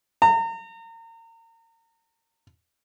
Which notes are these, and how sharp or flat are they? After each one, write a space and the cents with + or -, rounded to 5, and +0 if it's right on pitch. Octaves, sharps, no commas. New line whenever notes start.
A#5 -35